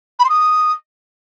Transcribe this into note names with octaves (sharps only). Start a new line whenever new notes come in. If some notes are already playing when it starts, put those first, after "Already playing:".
B5
C6
D#6